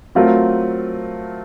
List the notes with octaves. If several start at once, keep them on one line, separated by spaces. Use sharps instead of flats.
F#3 A3 C4 F4 A#4